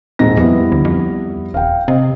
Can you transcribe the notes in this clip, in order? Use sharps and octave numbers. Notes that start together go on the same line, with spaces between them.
D#1 G#2 A#6
F2 G3 B3 E4
D2
F2
D#1 F5 G5
C3 D#5